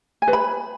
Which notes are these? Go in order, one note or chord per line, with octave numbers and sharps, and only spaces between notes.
G#5
B4
B5